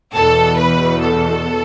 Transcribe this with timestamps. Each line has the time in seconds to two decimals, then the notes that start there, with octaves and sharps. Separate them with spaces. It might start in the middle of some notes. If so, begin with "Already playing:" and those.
0.14 E2 B2 A4
0.57 B4
0.99 A4